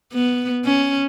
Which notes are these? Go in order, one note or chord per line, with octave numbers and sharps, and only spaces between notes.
B3
C#4